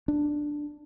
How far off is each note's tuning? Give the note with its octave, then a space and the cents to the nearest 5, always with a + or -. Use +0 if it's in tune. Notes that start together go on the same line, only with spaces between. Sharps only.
D4 +5